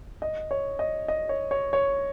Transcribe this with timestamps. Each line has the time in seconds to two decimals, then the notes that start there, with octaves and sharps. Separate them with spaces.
0.22 D#5
0.51 C#5
0.79 D#5
1.08 D#5
1.29 C#5
1.51 C#5
1.73 C#5